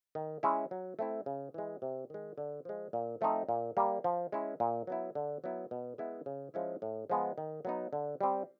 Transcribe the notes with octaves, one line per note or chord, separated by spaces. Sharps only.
D#3
G#3 C#4 E4
F#3
A3 C4 E4
C#3
E3 G#3
C3
D#3 G#3
D3
F3 G#3
A#2
F3 A3 C4 D#4
A#2
G3 A#3
F3
G#3 C#4 E4
A#2
F#3 B3 E4
D3
F#3 B3 E4
B2
G#3 B3 E4
C#3
F3 G#3 C#4 E4
A2
F3 G#3 B3
D#3
F#3 B3 D#4
D3
G3 C4